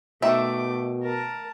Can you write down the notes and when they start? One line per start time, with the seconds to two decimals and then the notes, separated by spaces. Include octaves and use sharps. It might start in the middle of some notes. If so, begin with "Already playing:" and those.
0.22 B2 D#3 A3 E5 D6
1.03 A#4 A5